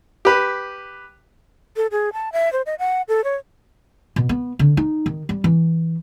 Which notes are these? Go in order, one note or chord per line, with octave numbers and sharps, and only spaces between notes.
G4 B4
A4
G#4
A5
E5
C5
D#5
F#5
A4
C#5
B2
B3
D3
D#4
D#3
G3
E3